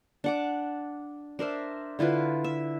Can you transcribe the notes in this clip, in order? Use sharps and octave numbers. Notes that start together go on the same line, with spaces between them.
D4 F#5 D6
D4 A#4 C5 E5
D3 E4 F4 B4
E5